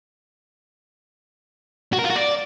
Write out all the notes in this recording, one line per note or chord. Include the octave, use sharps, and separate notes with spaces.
F#4
A#4
F4
F#4
D5